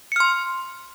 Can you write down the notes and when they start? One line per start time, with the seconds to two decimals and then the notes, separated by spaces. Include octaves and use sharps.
0.12 C#7
0.16 F6
0.20 C6